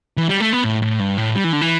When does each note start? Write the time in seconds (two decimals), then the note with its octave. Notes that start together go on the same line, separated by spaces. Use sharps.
0.17 E3
0.29 G3
0.40 A3
0.53 B3
0.64 A2
0.82 A2
1.00 G2
1.17 A2
1.35 G3
1.44 E3
1.53 D3
1.61 E3